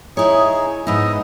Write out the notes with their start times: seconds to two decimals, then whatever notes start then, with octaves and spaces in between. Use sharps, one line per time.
0.17 D#4 E4 G#4 C#5
0.87 G#2 B3 D#4 D#5 E5